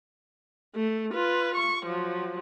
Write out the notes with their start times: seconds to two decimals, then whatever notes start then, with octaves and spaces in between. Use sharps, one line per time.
0.76 A3
1.14 F4 B4
1.56 C#6
1.85 F3 F#3